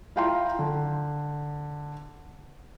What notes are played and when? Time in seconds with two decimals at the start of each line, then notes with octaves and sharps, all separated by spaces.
0.16 E4 F4 F5 G5 A#5 C6
0.59 D3